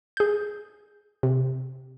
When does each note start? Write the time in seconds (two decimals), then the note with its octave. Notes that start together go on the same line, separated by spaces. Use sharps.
0.17 G#4 G6
1.23 C3